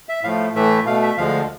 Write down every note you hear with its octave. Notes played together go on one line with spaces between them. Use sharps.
E5
A2 F3 A3 F5
A2 E3 A3 E5
B2 A3 F5
E5
D2 D3 F3 G#3 F5